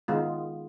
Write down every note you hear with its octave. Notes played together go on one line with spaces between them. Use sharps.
D#3 G#3 B3 F4